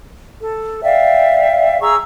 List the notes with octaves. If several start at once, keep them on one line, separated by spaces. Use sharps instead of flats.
A4
D5 E5 F5 G5
G#4 A#5 C#6 E6